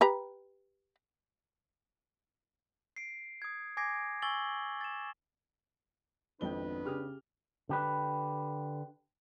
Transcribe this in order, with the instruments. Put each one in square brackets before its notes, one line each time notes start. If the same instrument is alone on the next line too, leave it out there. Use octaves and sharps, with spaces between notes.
[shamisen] G4 B4 A#5
[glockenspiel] C7 D7
D#6 G#6
G#5 D6 G#6 A#6 C7 D7
G#5 C#6 E6 A6 F#7 G7
A6 E7
[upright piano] G#1 F2 G7 [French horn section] B3 D4 [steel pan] D#4 G5 [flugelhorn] B4
[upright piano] C#3 F6 [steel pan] G4 G#4 D#6
[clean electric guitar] D3 G4 B4